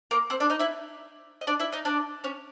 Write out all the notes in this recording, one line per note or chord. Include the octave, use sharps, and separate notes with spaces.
A#3 A#4
C4 C5
D4 D5
D#4 D#5
E4 E5
D#5
D4 D5
E4 E5
D#4 D#5
D4 D5
C#4 C#5